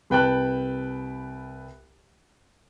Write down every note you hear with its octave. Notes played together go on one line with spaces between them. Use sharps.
C2 B4 G5 A5 F#6